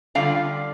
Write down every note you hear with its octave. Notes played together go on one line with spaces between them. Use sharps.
D3 G3 C4 F4 D5 F5